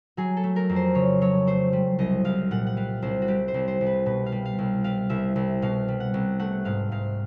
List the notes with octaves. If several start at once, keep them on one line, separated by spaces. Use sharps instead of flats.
F#3 G#4
A4
A3
A#4
F2
C5
C#3 C#5
F#3 C#5
A3 C5
G3
C2 D#5
C2 F5
A#2 F#5
F#5
G3 F5
C2 C5
F#4
G3 G4
C5
C2
C5
C2
B4
B2 B4
F5
G3
F5
C2
G3 F5
C2 E5
C2
B2 F5
G3
F#5
C2
A3 F#5
G#2 F5
G#2 F5